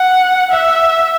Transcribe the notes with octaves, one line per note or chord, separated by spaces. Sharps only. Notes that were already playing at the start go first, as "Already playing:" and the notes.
Already playing: F#5
E5